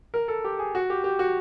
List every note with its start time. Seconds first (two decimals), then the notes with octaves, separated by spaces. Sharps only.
0.14 A#4
0.28 A4
0.44 G4
0.59 G#4
0.75 F#4
0.90 G4
1.04 G4
1.19 F#4